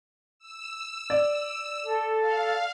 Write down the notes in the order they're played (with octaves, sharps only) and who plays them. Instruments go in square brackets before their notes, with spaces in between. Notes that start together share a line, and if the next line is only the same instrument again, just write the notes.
[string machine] E6
[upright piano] D5
[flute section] A4
[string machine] F5